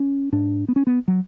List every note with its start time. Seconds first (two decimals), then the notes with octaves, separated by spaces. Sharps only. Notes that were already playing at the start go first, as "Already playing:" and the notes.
Already playing: C#4
0.33 G#2 D4
0.68 B3
0.76 C#4
0.87 B3
1.08 F#3